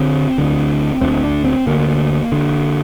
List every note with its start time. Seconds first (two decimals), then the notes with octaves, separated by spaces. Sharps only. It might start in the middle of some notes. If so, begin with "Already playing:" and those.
Already playing: D3 C4
0.38 D2 D3
1.01 D2 D3 C4
1.24 D4
1.45 C4
1.67 D2 D3 A#3
2.32 D3